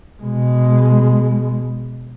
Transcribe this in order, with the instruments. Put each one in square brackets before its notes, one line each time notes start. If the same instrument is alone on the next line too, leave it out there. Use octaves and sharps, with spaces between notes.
[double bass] B2 G#3